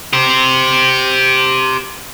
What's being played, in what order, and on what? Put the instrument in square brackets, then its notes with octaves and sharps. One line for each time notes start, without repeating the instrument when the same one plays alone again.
[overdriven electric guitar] G4 C5